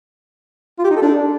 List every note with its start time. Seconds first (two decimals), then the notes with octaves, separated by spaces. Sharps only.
0.78 F4
0.84 G4
0.90 D#4
0.96 A4
1.02 D4